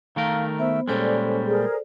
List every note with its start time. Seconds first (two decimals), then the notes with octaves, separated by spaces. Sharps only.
0.16 D#3 A3 A#4 F5
0.59 B3 C5 E5
0.88 A#2 G3 G#3 C#4 A4 C5 D5
1.47 G#4 A#4